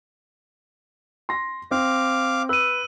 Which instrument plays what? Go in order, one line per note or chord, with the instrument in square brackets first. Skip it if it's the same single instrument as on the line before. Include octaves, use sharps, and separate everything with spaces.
[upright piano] C6 A#6
[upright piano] C4 [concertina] F5 D6
[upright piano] B4 [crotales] E6 D#7